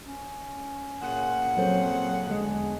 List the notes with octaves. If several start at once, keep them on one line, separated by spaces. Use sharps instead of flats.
C#4
A#2 C#3 F#5
F#3 C4 A4 C5
E2 D3 G#3